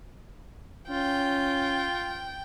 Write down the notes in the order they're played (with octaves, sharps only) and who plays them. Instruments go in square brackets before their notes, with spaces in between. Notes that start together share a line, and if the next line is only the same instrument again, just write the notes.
[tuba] C#4 [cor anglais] F4 [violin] G5